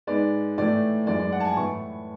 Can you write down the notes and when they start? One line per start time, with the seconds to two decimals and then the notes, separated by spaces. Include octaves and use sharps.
0.07 G#2 G#3 B3 D5
0.58 A2 E3 A3 D5
1.07 F#2 E3 G#3 D5
1.20 D5
1.32 F#5
1.40 A5
1.45 G#5
1.57 A2 E3 B3 C#6